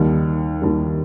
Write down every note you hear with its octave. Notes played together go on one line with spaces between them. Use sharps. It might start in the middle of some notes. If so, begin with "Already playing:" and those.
Already playing: D#2 D#3 G3
D#2 D#3 G3